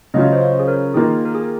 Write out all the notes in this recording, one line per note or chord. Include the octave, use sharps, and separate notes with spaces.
C#3 F#3 C#4 F4 D#5
C5
C#5
G#4
A#4
D#3 A#3 F4 G#4
A#4
G#4